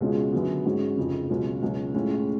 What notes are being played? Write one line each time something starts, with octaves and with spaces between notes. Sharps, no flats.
C#2 B2 G#3 C#4 F4
F#2 D3 F#3 B3
G#2 G#3 C#4 F#4
F1 F2 C#3 F3
C#2 B2 F#3 C#4 F4
C#2 B2 F#3 C#4 F4
A2 G#3 C#4 F4